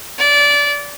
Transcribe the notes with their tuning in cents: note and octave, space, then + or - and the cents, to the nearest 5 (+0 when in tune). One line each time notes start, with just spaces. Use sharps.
D5 -20